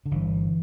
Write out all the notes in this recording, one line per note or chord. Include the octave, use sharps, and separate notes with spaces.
D3
G1 E3